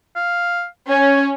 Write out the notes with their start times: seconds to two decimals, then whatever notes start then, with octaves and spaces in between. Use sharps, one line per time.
0.16 F5
0.90 C#4 G#5